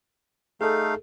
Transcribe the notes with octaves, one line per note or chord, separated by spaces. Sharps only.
A3 D#4 G#4 A4 F5